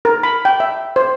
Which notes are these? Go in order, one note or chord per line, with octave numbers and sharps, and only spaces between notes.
A#4
B5
G5
E5
C5